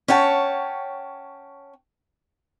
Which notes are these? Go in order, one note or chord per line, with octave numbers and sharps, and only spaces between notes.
C#4 C#5 F#5 G5 A5